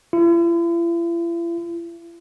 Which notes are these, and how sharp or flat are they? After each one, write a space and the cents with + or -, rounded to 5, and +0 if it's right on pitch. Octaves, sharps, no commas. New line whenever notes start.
E4 +45